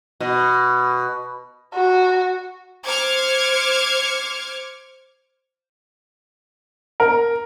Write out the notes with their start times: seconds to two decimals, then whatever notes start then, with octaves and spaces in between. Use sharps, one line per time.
0.20 B2
1.74 F#4
2.86 C5 D6 F6 G#6 C#7
7.00 A#4